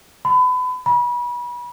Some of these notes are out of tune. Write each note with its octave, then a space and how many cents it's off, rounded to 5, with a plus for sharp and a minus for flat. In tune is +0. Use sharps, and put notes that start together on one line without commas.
B5 +30
B5 -30